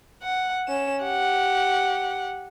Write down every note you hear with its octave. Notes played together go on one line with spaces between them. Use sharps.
F#5
C#4 E7
G4 F#5